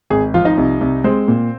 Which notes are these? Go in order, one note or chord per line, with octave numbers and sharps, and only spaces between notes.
G#1 G#4
F3 F4 F5
D#4 D#5
C2
C2
G#3 C4 C5
A#2